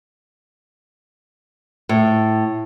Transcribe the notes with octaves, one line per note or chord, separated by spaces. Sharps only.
A2